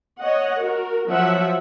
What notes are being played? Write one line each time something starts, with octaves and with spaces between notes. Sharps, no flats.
C#5 D#5 F#5
F#4 A#4
F3 F#3 E5 F#5